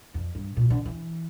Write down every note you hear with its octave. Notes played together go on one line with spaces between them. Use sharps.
F2
G2
A#2
D3
E3